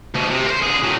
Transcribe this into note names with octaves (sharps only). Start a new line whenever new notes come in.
D2 B2
C3
A#4 C5
D3 G#4
A2 F#3